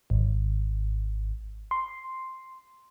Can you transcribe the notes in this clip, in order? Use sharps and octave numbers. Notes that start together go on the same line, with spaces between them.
G#1
C6